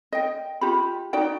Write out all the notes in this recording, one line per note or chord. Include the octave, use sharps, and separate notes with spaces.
D#5 G5
F4 G4 B5
D#4 F#4 D5 G5